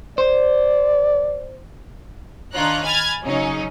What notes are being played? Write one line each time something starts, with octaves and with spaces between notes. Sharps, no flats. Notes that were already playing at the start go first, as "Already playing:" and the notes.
C5 D5
D#3 D4 F4 C#5 A#5 F#6
G#5 B5 F6 G#6 A6
C#3 F#3 C#4 D#4